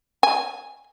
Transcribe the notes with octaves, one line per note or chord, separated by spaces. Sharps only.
G#5